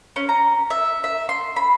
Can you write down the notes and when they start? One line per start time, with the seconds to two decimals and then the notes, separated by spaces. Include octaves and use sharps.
0.16 C#4
0.29 A#5
0.70 E5
1.04 E5
1.29 C6
1.56 B5